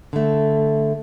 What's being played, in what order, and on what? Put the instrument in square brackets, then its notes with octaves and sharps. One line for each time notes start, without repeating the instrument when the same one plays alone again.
[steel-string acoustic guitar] D3 A3